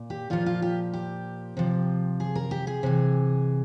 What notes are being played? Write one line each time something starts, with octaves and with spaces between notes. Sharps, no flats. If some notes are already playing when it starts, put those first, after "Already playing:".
Already playing: A#2
G4
A#2 F3 F4
F4
G4
G4
C3 F3
G#4
A#4
G4
G#4
C3 E3